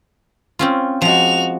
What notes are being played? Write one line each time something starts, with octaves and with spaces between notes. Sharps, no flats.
C4 C#4 F4
F3 G#3 F#4 F7